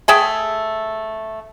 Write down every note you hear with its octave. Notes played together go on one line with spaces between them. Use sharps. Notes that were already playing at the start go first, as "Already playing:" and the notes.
A3 G#4 E5 G5